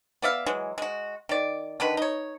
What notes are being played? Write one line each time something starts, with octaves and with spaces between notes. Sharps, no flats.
B3 D5 E5 F5
E3 F#3 G#3
G#3 F#4
D#3 D5
D3 D#3 B4
D#4 C#5